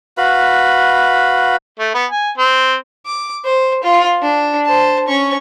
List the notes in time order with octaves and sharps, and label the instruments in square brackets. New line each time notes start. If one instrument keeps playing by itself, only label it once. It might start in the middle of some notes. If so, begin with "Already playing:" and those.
[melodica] F#4 B4 F5 B5
[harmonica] A3
B3
G#5
C4
[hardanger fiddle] D6
C5
F4
D4
C5 A5
C#4 C#6